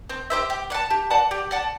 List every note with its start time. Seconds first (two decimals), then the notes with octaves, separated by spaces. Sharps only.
0.10 C4
0.30 G4 C5 E5
0.50 G4
0.70 D5 F#5 A5
0.90 G4
1.10 D5 F#5 A5
1.31 G4
1.51 D5 F#5 A5